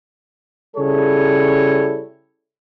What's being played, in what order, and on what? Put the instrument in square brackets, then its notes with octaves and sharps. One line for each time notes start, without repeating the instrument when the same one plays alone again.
[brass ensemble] C#3 G3 E4 G#4 A4 C#5